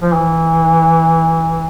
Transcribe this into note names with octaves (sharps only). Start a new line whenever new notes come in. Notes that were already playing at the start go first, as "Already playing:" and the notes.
F3
E3